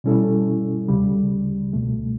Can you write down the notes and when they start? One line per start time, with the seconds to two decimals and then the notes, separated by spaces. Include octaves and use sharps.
0.04 B2 G3 C#4 E4 A4
0.88 D2 C#3 G3
1.73 C#2 B2 A3